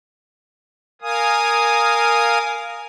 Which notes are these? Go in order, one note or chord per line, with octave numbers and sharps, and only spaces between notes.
A#4 F5 G#5 D#6